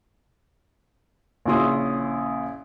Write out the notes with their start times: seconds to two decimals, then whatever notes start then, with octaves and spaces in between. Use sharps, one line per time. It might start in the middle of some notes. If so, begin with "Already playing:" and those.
1.45 A#1 C#3 C#4 E4 C6 D#6